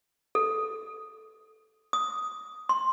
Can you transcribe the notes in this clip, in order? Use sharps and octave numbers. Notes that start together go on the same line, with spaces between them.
A4
D#6
C6